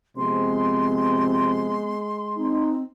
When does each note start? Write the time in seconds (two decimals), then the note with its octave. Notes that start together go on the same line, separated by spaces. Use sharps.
0.17 C3 F3 G#3 B3 C4 C6
2.37 C4 D#4